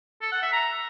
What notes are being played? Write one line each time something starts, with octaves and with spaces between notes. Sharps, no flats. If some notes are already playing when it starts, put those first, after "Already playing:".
A4
F#5
E5
A#5